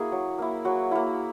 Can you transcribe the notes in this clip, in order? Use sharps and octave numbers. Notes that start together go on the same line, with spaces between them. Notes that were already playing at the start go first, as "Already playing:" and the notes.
Already playing: A#3 E4 F#4 G#4
F#3
A#3 E4
F#3 F#4
A#3 E4